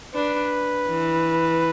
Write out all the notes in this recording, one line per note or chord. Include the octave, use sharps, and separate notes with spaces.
D4 B4
E3